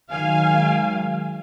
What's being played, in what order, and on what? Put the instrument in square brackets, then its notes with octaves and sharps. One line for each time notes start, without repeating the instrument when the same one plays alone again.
[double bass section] D#3 F#3 G#3 [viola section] F5 G#5